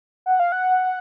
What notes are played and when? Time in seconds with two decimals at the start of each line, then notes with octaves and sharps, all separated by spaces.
0.26 F#5
0.40 F5
0.52 F#5